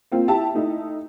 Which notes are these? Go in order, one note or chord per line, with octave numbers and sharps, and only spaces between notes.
A#3 C4 F4
E4 G4 E5 A5
A3 D#4 E4